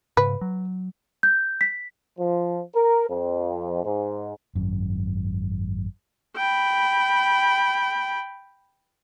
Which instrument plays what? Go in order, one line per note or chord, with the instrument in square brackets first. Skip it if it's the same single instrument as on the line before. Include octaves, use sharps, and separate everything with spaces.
[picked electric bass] G#2 C#3 [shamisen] B4
[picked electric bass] F#3
[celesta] G6
B6
[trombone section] F3
A#4
F2
G#2
[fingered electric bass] G#1 F#2
[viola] G5 B5